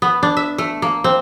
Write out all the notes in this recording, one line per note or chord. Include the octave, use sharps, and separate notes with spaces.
B3
D4
E5
A3
A#3
C4